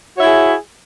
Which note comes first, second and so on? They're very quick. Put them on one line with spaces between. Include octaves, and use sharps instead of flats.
F#4 C#5 E5 E4 G#4